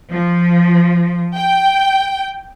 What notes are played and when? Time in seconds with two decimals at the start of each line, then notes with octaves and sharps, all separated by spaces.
0.12 F3
1.35 G5